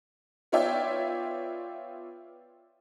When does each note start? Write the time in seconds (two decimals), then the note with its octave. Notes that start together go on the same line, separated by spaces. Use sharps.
0.52 B3 F4 C#5 D5 E5 G5